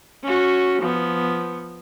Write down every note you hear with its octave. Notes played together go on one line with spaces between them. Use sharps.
C#4 F#4
F3 B3